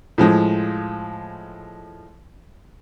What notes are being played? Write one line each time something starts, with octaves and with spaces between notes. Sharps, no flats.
A2 F3 G#3